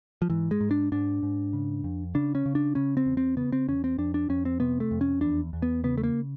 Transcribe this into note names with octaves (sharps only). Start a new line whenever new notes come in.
F3
G#2 E3
G#3
G#2
D4
G#2 D4
G#2
C#3
F2
C#3 D4
C#4
C#3
D4
C#3 C#4
C4
E2
C4
C#3 B3
C4
E2 C#4
C4
F2 D4
D4
F2 C#4
C4
C3 B3
A3
F2
C#4
E2 D4
E2
B3
C#3 B3
A3
A#3